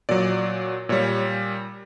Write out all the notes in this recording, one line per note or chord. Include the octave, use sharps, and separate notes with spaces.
A#2 F#3 D5
A#2 G3 C#5